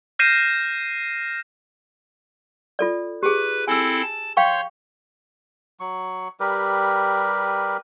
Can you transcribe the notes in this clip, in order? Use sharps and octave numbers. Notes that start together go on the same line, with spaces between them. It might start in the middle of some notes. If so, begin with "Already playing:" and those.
F6 G6 A#6 C7 D#7 E7
F4 A4 D5
G4 G#4 B4
C4 E4 A4 G#5 E6
A5
C#5 F5 G5 C6 C#6 G6
F#3 C#6
G3 G4 A#4 B4